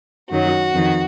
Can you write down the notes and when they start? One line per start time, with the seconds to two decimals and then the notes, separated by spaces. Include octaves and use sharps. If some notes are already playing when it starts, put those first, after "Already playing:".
0.31 F#2 D#3 F#3 F#4
0.73 F2 D#3